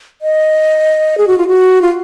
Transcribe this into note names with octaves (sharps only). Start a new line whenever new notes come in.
D#5
G#4
F#4
F4
F#4
F4